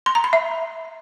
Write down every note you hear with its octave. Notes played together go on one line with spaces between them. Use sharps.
C6
A#5
B5
E5